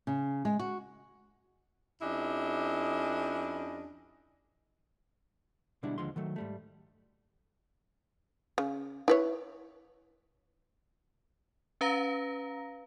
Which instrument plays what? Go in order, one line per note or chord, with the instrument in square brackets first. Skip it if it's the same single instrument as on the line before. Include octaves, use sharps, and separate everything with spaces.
[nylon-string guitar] C#3
G#3
F#4
[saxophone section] F2 C#4 D4 E4 G4 D#5
[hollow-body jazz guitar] B2 D3 G3 G#3 D4 E4
D#2 D3 F3 G#3 C6
D#3 F#3 A3
G#2 G3 A3
[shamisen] C#3
E4 B4 C#5
[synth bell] C#4 B4 F5 A#5 A#6